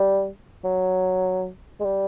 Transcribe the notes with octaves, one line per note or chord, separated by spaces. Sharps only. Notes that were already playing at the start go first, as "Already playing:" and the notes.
Already playing: G3
F#3
G#3
G3